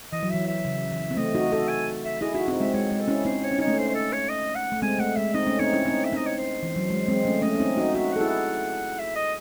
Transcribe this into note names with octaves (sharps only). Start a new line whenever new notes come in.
E3 D#5
F#3
E3 E5
E5
C#3
E3
C4
A3 D#5
D#4 F#4
F#4 A4
G#5
E5
E4 G#4 D#5
D#4 F#4 E5
C4 D#4
G#3 C4 E5
G#3 C#5
G#3
A4
C#4 E4
C4 D#4 C5
C#5
C#4
D#4 C#5
A3 C#4
C5
C5
A4
C#5
D#5
F#5
A3
G#3 C4 G#5
A3 F#5
G#3 E5
C4 D#4 D#5
A3 C#4
C4 D#4 C#5
C#4 E4
C4 D#4
E5
C4 D#4 D#5
C#5
C5
E3
F#3
G#3
G#3 C4
A3 C#4
A3 C#4 D#5
C#4
C4 D#4
D#4 F#4
D#4 F#4 E5
A4 F#5
E4 G#4
F#5
E5
D#5